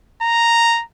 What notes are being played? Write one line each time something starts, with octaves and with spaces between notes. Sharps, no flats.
A#5